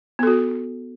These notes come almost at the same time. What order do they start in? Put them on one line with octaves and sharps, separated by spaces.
B3 A4 F#4